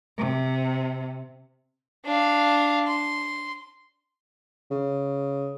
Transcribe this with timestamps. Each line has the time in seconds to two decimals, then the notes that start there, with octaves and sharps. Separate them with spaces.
0.18 C3
2.05 D4 F5
2.87 C6
4.71 C#3